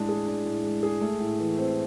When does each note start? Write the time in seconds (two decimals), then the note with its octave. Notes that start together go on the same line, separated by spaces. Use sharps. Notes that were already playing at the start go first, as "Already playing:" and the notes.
Already playing: A2 G#3 D4
0.09 G#4
0.27 D4
0.45 A2
0.64 G#3
0.83 G#4
1.01 A3
1.20 A2
1.39 E3
1.58 C4